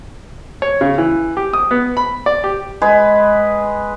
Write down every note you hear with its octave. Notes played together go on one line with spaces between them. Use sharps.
C#5
C#3
E3
G4
D#6
B3
B5
D5
G4
G#3 G#4 B4